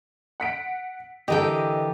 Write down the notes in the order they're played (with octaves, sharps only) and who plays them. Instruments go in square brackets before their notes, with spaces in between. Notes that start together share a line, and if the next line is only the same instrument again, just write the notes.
[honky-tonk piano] F#5 B6 D7
[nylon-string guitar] D3 E3 A4 [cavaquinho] G4 A#4 G5 [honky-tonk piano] D#5